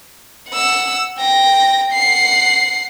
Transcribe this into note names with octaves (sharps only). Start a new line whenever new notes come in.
F#5 E6
G5 A#6
F#5 C7